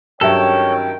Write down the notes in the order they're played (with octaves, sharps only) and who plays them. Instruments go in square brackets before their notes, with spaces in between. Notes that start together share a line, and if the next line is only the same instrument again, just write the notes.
[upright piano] G2 F#3 E5 [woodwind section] D#3 C#4 G5 [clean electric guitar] A4 [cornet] C#5